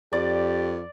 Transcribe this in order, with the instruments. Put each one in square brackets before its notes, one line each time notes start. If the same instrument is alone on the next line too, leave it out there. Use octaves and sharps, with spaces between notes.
[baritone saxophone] F2 [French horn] G4 [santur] D5